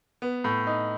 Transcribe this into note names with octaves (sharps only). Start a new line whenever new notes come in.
B3
A2
D#4